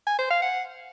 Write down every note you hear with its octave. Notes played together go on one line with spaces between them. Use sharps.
G#5
C5
F5
F#5